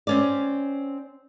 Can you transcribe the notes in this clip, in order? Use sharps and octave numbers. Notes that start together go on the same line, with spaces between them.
C4 C#4 D5